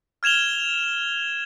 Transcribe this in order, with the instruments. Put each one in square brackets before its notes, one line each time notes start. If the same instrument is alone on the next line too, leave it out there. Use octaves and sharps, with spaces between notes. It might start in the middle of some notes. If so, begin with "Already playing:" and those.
[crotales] F6 G#6 E7 F7 G7